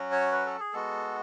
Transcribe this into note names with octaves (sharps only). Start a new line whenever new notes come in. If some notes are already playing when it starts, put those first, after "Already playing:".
Already playing: F#3 C#4 F#4
C#5
B4
A4
G#4
G#3 B3 F#4 A4